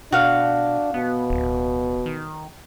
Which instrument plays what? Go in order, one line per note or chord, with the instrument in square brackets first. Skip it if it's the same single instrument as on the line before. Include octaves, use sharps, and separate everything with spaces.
[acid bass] B2 [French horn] D4 [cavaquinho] F#4 F5
[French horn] B2 [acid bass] B3
[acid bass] D1
D#3